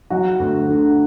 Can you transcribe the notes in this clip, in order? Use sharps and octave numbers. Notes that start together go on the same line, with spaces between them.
F#3 F#4
D2
D3